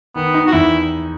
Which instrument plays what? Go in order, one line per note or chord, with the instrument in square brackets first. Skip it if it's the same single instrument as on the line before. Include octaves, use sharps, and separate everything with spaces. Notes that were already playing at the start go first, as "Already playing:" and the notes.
[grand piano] D#3 [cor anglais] B3
[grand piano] D#4
[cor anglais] F#4
[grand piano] E2 [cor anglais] E4